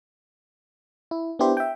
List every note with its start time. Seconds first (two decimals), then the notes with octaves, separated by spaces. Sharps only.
1.11 E4
1.39 B3 D4 E4 G4 C5
1.57 E5 G5